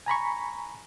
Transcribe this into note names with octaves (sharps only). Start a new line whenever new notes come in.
G#5 A#5 B5 C#6